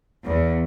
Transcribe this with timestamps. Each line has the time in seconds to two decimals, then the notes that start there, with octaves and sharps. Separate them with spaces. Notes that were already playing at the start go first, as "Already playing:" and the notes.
0.25 E2